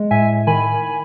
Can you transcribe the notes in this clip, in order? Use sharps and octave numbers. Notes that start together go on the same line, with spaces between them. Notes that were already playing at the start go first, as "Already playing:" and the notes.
Already playing: G#3
A2 E5 G#5
D#3 G#5 B5